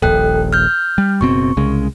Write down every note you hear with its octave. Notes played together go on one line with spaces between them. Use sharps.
D#1 A#1 A4 G5 F#6
F6 G6
G3
F#1 B2 C4 C#6
C2 C#3 G#3